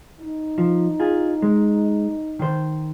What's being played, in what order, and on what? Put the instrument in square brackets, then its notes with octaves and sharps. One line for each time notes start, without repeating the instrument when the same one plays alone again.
[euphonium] D#4
[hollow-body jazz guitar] F3
F4 G#4
G#3
D#3 C5